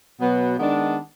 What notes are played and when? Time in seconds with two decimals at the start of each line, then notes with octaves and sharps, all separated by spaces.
0.19 B2 F#3 B3
0.58 D#3 G#3 B3 D4